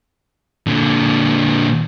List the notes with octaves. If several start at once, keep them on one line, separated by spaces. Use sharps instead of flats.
A#2 D3